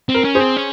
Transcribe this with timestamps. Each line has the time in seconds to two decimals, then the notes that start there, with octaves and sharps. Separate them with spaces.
0.09 C4
0.14 A#4
0.24 C#4
0.35 G#4 C5
0.40 C4
0.56 C#4